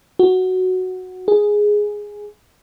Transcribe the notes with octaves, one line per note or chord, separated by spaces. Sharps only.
F#4
G#4